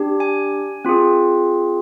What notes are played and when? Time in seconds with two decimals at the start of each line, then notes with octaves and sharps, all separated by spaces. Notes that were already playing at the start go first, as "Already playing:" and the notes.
Already playing: D4 G4
0.20 G#5
0.85 C4 F4 G#4